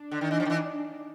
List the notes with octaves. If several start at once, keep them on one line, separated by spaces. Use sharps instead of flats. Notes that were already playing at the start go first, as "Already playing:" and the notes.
Already playing: D4
D3
D#3
E3
F3
D#3
E3